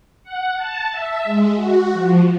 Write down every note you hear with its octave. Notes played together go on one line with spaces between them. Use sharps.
F#5
A5
E5
G#3
F#4
F3